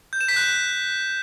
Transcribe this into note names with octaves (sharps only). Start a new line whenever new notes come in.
G6
E7
B6
F#6